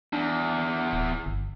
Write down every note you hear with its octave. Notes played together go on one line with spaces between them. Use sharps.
E2 D4
D1
G1